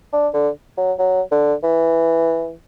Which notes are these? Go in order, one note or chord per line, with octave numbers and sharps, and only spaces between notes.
D4
D3
F#3
F#3
D3
E3